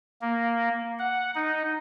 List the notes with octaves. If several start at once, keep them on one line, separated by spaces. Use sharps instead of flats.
A#3
F#5
D#4